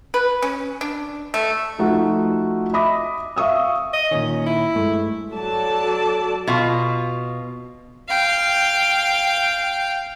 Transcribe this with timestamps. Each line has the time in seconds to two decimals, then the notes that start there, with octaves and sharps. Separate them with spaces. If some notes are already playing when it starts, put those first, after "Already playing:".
0.14 B4
0.42 C#4
0.81 D4
1.34 A3
1.79 F3 A3 D#4 F4 F#4
2.73 D#5 E5 B5 D6 D#6 A#6
3.36 E5 F5 C#6 D#6 E6
3.93 D#5
4.11 A#2 D#3 C#4
4.47 E4
4.75 G2 G#3 A3
5.32 F#3 A4 D5 A5
6.47 B2 F4
8.08 F5 G5